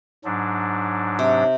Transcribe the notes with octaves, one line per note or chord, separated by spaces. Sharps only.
G#2 F#3 D4
C3